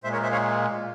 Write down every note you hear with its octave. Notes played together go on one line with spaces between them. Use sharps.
A#2 G#3 C5 E5
A#4 C#5
C5 E5
C#5 F5